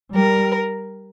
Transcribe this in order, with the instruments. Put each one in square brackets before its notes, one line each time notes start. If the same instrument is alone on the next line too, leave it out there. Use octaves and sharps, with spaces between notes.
[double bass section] G3 [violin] A#4